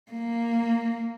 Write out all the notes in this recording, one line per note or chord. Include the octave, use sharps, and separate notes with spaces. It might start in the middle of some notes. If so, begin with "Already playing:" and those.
A#3